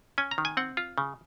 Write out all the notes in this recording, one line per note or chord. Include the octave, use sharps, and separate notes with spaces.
C#4 G#5
A#5
D#3
G#5
C4 F#5
F4
C#3